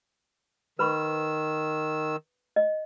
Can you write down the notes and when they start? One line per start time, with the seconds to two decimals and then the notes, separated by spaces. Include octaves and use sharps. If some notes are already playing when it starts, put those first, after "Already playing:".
0.79 D#3 B4 B5 C#6 E6
2.56 D#5